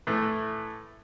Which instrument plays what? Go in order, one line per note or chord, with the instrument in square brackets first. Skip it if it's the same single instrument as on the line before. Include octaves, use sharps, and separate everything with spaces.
[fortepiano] A2 E3 A3